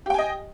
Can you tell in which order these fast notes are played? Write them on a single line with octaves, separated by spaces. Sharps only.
G4 G5 G#5 D#5